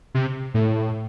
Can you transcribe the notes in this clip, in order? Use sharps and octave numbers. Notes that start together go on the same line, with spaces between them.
C3
A2